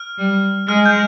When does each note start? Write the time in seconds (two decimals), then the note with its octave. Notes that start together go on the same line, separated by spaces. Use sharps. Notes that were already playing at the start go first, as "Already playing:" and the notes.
Already playing: F6
0.18 G3
0.69 G#3 F6
0.86 G6